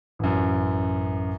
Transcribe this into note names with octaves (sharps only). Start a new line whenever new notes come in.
A1 F#2